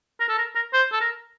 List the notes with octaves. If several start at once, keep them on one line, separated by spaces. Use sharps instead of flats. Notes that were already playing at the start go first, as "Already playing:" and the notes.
A#4
A4
A#4
A#4
C5
A4
A#4